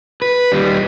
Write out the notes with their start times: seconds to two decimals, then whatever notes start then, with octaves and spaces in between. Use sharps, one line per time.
0.22 B4
0.52 D#2 G3